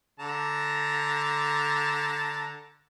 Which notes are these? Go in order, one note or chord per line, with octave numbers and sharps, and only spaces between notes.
D3 A5 A#5